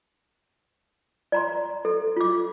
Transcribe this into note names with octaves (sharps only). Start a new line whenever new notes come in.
D5 A#5 C6
A4
F4 D6